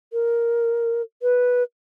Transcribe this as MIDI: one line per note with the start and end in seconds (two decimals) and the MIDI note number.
0.13 1.02 70
1.22 1.63 71